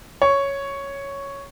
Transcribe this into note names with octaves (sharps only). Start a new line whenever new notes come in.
C#5